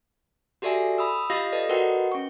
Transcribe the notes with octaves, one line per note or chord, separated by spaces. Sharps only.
F#4 G4 A4 D5 E5 G#5
B5 D#6 E6
F4 G4 D#5 F5 A#6
A4 B4 D5 D#5
F#4 A#4 B4 D#5 F#5 G5
C#4 C#6